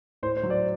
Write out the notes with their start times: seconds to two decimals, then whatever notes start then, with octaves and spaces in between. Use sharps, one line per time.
0.23 A2 C5
0.37 C5
0.43 F#3
0.50 D5